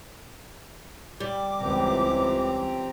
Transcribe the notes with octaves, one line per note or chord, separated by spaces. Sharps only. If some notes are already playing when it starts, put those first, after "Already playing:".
G3 D6
C#2 E3 C4 G4 A#5